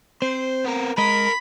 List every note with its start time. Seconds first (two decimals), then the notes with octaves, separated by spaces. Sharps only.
0.22 C4 C5
0.65 B3 A#4
0.98 G#3 A#4 D#5 B5